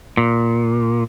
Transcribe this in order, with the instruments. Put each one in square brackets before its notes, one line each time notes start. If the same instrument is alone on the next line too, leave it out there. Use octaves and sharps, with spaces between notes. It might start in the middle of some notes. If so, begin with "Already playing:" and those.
[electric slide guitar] A#2